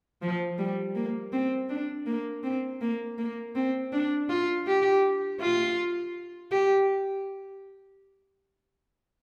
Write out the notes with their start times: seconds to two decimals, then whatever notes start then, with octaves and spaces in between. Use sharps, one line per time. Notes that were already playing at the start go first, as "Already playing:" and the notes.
0.22 F3
0.59 G3
0.96 A#3
1.33 C4
1.69 D4
2.07 A#3
2.43 C4
2.81 A#3
3.18 A#3
3.55 C4
3.92 D4
4.30 F4
4.67 G4
5.41 F4
6.52 G4